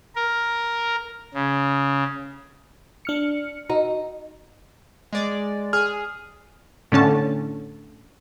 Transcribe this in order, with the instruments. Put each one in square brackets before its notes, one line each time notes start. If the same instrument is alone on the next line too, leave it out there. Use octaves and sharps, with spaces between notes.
[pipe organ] A#4
C#3
[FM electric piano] D4 F6 C#7
[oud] D#4 [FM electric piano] F#4
[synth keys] G#3 D5
[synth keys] G#4 [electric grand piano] F6
[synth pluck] A2 D3 C#4 A5